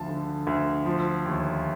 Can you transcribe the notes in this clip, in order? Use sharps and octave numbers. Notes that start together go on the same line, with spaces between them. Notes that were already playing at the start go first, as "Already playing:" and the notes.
Already playing: D2 F3 A5
D3
D2
F3
D#2